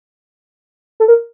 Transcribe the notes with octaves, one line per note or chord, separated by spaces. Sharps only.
A4
A#4